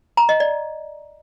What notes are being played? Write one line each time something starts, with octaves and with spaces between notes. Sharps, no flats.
A#5
D#5
D5